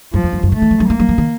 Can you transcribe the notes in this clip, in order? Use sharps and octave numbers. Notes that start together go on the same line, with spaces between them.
F#2 F3
F2
F#2
F#2
A#2 A3
D#3
F3
F#3
A3 A#3
F#3
F3
D#3